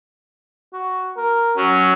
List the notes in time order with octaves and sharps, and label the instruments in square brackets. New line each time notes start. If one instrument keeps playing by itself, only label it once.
[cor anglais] F#4
A#4
[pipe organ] F#3 [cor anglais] C#4